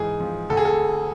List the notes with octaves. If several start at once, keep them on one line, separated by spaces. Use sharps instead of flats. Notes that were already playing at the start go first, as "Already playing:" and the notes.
Already playing: G#2 E3 G#4
F3
D2 A4
G#4
A4